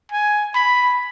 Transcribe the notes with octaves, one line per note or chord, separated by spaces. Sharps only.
G#5
B5